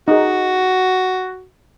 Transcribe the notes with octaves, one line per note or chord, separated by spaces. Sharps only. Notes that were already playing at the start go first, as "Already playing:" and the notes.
D#4 F#4 G#4